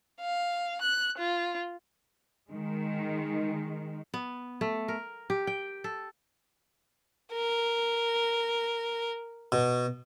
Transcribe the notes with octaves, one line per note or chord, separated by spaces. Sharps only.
F5
F#6
F4
D#3 G#3
B3
A3
A#4
G4
G5
A4
A#4
B2